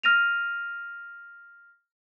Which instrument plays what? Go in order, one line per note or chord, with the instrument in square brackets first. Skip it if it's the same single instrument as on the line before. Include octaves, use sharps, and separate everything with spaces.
[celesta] F6 A#6 D#7 F7